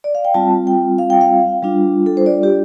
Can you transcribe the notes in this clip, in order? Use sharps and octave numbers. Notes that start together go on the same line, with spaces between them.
D5
F5
G5
G3 C4 F4 A5
G5
F5
G5
F5
G3 D4 F4
A4
C5
D5
G4